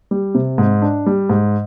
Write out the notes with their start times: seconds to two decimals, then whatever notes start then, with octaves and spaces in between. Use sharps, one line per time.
0.11 G3
0.35 C3
0.58 G#2
0.82 D4
1.06 G3
1.30 G#2